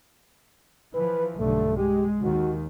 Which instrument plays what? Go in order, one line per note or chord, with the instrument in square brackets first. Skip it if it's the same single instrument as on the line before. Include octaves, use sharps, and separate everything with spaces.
[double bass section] E3 F3 [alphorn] B4
[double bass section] B1 G2 D3 [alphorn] A3
[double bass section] G#3 [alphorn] G4
[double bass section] D#2 D#3 [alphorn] F#4